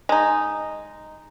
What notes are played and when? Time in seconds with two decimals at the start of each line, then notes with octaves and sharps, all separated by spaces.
0.09 G#3 D#4